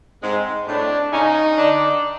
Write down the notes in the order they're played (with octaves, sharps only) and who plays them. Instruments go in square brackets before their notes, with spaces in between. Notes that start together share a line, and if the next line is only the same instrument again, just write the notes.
[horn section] G#2 G#3 [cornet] C4
[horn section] A2 A3 [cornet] D4
[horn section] C#3 C#4 [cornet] D#4
[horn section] D3 D4